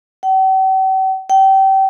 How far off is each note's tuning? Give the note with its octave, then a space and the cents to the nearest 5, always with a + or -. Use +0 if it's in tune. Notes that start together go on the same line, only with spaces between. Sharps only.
G5 -45
G5 -30